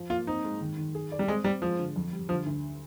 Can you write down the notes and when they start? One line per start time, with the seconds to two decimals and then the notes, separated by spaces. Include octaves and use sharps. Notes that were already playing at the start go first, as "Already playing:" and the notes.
Already playing: F3
0.10 A#3 F4
0.27 C4 D#4
0.44 G#3
0.61 D#3
0.77 D#3
0.95 G#4
1.12 D5
1.19 G3
1.28 G#3 C4
1.44 G3 C4
1.62 F3 G#3
1.79 D3
1.96 F2
2.13 G3
2.29 D3 F3
2.46 D2